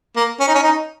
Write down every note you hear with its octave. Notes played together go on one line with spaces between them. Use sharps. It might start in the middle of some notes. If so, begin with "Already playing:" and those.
A#3
C#4
D#4
C#4
D#4